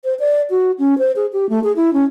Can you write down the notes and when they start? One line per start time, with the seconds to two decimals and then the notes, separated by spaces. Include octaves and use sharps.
0.04 C5
0.20 D5
0.50 F#4
0.79 C#4
0.98 C5
1.16 G#4
1.33 G4
1.49 A3
1.64 G#4
1.76 E4
1.93 C#4